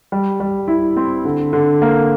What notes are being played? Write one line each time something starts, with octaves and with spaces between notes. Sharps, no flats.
G3
G3
E4
C4
D3
D3
A#3